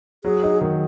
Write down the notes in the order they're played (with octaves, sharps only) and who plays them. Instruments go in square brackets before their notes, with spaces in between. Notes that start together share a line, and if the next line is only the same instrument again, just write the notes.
[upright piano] F#3 [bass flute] G#4
[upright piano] D#4
D#3